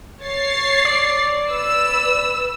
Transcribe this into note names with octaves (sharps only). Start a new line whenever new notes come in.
C#5 A6 C7
D5
B4 E6